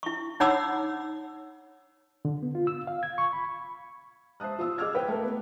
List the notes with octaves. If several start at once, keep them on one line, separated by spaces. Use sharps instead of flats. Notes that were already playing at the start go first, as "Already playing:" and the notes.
E4 C#6
D#4 C#5 F#5 B5 D6 E6
D3
B3
F4
E6
F5
G#6
C#6
B5
C5 E5 A5 D#6 F#6
F4 D#6 E6
G#4 D#5 D6 E6 F6 G#6
B4 G5
A3 A#4
B3